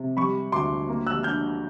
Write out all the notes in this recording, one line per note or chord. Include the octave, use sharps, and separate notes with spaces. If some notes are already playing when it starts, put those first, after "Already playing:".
Already playing: C3
G3 B5 C#6
D2 C6 D6
A#3
E6 F#6
D3 F6 G6